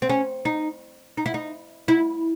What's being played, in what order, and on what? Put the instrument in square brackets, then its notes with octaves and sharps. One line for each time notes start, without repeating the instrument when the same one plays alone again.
[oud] C4
C#4
D#4
D#4
E4
D#4
E4